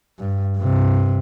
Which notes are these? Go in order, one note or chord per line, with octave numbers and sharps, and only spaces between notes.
G2
G2 C3